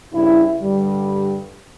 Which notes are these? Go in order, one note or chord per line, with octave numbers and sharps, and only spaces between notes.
G2 C#3 E4
G2 D3 G3